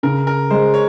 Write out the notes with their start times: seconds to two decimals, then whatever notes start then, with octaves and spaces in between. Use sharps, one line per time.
0.03 C#3 A#4
0.27 A#4
0.51 G#3 C5
0.74 C#5